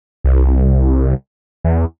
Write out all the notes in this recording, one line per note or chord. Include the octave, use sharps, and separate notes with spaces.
C2
E2